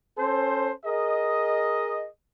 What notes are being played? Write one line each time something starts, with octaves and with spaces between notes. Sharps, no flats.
C#4 A4 C5
G#4 A#4 D#5